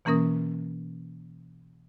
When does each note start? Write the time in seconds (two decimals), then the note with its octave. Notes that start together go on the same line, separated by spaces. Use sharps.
0.05 B2 E3 A#3 C#4 A#4 D#6